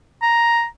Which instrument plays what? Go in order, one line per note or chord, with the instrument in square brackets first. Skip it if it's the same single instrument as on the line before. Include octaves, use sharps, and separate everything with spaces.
[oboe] A#5